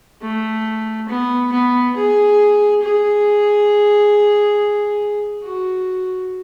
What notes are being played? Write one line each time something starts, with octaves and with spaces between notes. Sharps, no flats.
A3
B3
B3
G#4
G#4
F#4